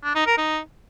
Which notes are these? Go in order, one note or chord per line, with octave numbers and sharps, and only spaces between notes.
D4
D#4
A#4
D#4